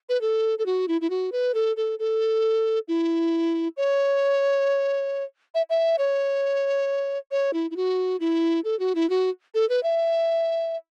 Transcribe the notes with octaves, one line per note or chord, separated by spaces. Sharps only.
B4
A4
A4
F#4
E4
E4
F#4
B4
A4
A4
A4
E4
C#5
E5
E5
C#5
C#5
E4
E4
F#4
E4
A4
F#4
E4
F#4
A4
B4
E5